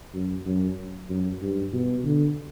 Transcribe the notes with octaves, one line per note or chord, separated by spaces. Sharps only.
F#2
F#2
F#2
G2
B2
D3